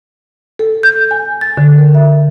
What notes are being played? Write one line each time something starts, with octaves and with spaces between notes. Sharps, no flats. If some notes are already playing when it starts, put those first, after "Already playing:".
A4
G6
G#5
A6
D3
A#4
E5